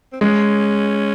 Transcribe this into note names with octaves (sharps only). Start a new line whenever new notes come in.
C4
G#3 C#4